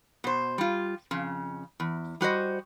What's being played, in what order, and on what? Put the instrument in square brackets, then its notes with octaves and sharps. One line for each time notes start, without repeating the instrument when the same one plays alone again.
[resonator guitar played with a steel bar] B2 C5
G3 F4
F2 C#3
E2
G3 F#4 C5 D#5